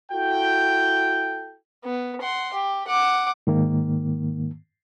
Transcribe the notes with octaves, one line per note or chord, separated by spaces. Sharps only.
E4 F#4 A4 G5
B3
F#5 C6
G4
F#5 D6
G#2 D#3 A#3